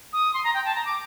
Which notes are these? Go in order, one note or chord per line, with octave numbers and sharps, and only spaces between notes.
D#6
C6
A#5
G5
A5
A#5
D6